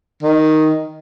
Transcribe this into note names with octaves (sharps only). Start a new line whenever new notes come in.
D#3